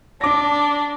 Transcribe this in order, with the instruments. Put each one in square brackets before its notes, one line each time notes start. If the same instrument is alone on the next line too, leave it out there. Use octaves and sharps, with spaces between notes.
[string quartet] D4 [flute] A5 [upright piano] D6 A#6